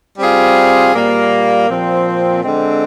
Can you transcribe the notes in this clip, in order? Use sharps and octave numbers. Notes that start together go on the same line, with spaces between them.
G3 C4 F4 G#4
A#2 G3 A#3
A#2 F3 C4
D3 G#3 C4